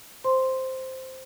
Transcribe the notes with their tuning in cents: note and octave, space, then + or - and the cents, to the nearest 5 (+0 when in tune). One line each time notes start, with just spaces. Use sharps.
C5 +0 C6 +0